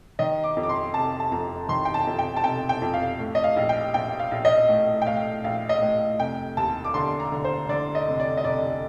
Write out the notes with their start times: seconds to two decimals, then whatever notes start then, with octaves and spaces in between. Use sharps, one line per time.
0.19 D#3 D#5
0.44 D6
0.57 F2
0.63 D6
0.69 C6
0.94 F1 A5
1.20 A5
1.31 F2 A#5
1.69 D#3 C6
1.85 G5
1.94 A5
2.07 F2
2.19 G5
2.36 A5
2.44 F1 G5
2.69 G5
2.82 F2
2.94 F5
3.19 A2
3.35 D#5
3.44 F5
3.56 A#1
3.69 G5
3.94 A#1 G5
4.19 F5
4.31 A#1
4.45 D#5
4.69 A2
5.02 G5
5.07 A2 F5
5.44 A#1 F5
5.69 D#5
5.82 A2
6.19 F1 G5
6.57 D#2 A5
6.84 D6
6.94 D3 C6
7.20 A#5
7.32 D3
7.44 C5
7.69 D3 D5
7.95 D#5
8.07 F1
8.20 D5
8.37 D#5
8.44 F1 D5